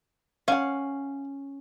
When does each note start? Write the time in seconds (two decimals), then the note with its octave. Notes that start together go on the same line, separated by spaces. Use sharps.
0.48 C#4 F5 F#5